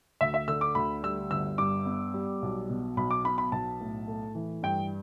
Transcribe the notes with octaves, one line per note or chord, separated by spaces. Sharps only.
D2 E5
E5
D3 E6
D6
D2 B5
G3 E6
G1 E6
G2 D6
B3
G3
B1
B2
B1 B5
D6
B3 B5
B5
B1 A5
A2
A3
E3
G2 G5